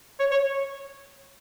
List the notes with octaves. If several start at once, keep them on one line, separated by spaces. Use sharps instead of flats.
C#5
C#5